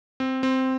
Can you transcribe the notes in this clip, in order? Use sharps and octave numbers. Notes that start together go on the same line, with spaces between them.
C4
C4